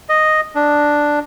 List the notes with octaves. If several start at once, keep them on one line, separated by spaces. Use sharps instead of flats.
D#5
D4